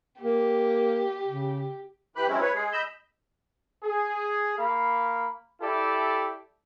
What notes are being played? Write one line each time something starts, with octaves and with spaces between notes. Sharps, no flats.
A#3 G4
C#3
E3 G4 B4 B5 F#6
F#3 G#3 C4 C#4 E4
B4 C#5
G#3 G#4
D#5 B5 E6 G6
G#4
A#3 F5 B5
E4 G4 A4 D5 E5